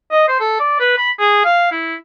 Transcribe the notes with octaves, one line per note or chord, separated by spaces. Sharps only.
D#5
C5
A4
D5
B4
B5
G#4
F5
E4